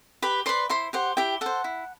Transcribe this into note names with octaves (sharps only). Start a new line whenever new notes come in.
G4 B4 B5
B4 C5 D5 C6
E4 C5 C6
G4 C5 F#5
E4 G4 G5
A4 C5 F#5
E4